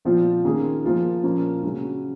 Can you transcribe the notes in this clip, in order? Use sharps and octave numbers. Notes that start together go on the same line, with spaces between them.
A#2 F3 C4 F4
D#3 A#3 C#4 G#4
F3 A#3 F4 G#4
A#2 F3 A#3 C#4
C#3 F#3 C#4